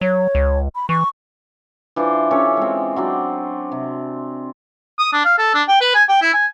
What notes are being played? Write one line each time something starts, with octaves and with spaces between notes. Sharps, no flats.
F#3 C#5
C#2
B5
E3 C#6
E3 D4 F4 C5
C#4 G4 A4 C#5
G#3 C4
F#3 C4 D4
C3
D#6
D4
F5
A4
D4
G5
B4
G#5
G5
E4
G#5